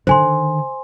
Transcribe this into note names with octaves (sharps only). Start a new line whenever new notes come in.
D3 D#3 C5 G#5 C6